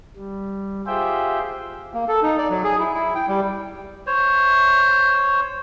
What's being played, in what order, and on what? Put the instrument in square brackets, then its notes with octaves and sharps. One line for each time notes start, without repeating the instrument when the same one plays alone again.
[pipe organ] G3
F4 G4 G#4 C5 E5 G5
[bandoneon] A#3
A4
D#4
D5
F#3
G#4
E4
E4
G5
G3
[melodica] C5 C#5